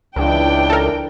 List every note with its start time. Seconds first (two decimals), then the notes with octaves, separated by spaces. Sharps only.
0.16 C#2 E3 D4 G5
0.70 A4 A#4